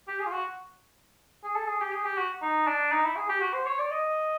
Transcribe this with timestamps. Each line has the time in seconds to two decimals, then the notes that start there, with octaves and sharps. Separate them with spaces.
0.08 G4
0.20 G#4
0.26 F4
0.32 F#4
1.44 G#4
1.56 A4
1.68 G#4
1.81 G4
1.92 G#4
2.05 G4
2.18 F#4
2.42 D#4
2.67 D4
2.92 D#4
3.05 E4
3.16 G#4
3.29 G4
3.41 F#4
3.54 C5
3.66 C#5
3.79 D5
3.91 D#5